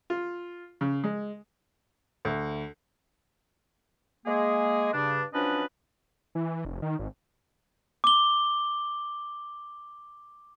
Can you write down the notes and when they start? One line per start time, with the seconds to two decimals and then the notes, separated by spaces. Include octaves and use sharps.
0.10 F4
0.81 C#3
1.04 G#3
2.25 D2
4.26 G#3 A#3 G#4
4.94 G2 C#3 D4
5.34 F3 F#3 C#4 D4 B4 D#5
6.35 E3
6.65 F1
6.82 D#3
6.99 G#1
8.04 D6 G7